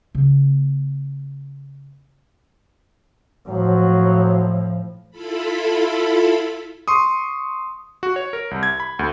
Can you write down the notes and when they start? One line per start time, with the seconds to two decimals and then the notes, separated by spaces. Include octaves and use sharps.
0.15 C#3 A#3
3.48 A2 F3 F#3
5.11 E4 F4 A4 B5
6.88 C6 C#6 D#6
8.03 F#4
8.16 C#5
8.33 A#4
8.51 C2
8.63 G#6
8.80 B5
8.99 D2